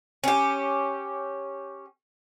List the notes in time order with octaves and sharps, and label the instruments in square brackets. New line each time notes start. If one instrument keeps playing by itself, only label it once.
[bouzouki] C#4 G4